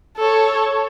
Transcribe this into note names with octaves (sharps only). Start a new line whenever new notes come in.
A4 C#5